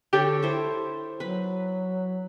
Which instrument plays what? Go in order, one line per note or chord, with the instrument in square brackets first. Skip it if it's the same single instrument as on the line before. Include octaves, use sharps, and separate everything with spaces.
[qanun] D3 A4 C#5 [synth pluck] G4
[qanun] E4 A4 C5
[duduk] F#3 [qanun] B4 B5